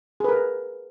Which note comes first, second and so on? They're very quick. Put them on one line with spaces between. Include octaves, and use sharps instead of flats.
G#4 B4 A#4